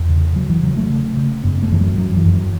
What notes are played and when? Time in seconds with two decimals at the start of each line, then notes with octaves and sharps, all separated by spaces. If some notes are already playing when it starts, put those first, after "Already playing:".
Already playing: E2
0.09 C#3
0.36 C#3 F#3
0.50 E3
0.63 C#3 F#3
0.77 A3
0.90 C#3
1.17 C#3
1.44 F#2 B3
1.63 A3
1.71 F#2 E3
1.81 F#3
1.98 F#2 F#3
2.16 E3
2.25 F#2
2.33 F#3